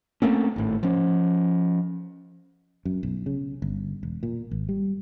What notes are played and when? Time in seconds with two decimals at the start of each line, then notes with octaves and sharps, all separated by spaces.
0.22 A3 A#3 C4 C#4
0.56 G#1 A2
0.83 F3 C#4
2.85 F#2
3.03 B1
3.26 C#3
3.62 G1
4.03 E1
4.23 A#2
4.51 G#1
4.69 G3